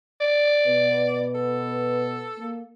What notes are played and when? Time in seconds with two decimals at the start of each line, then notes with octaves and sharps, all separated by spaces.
0.21 D5
0.67 B2 B3 B4
1.35 A4
2.38 A#3